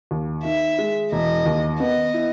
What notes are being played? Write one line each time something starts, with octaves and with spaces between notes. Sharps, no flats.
D#2
D#3 E5
G#3
E1 D#5
D#2
B3 D#5
E4